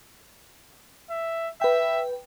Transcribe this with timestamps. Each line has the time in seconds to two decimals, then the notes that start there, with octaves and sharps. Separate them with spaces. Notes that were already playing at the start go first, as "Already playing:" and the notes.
1.10 E5
1.61 B4 E5 G5